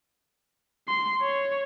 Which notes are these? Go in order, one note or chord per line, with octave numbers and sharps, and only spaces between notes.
C6
C#5